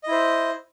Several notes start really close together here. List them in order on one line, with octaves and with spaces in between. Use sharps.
D#5 E4 C5